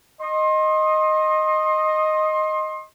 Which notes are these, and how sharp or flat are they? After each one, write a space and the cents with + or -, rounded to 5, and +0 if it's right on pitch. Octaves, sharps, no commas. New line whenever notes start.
D#5 +0 C6 +30